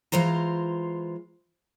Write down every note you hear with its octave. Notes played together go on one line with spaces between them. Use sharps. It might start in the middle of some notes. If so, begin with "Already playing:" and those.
E3 G#3 F4 C5 A#5